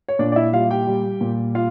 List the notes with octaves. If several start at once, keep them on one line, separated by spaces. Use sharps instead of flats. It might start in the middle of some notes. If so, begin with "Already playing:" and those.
C#5
A#2 D4 D5
D5
E4 E5
G3 F4 F5
G4 G5
G3
A#2
F4 F5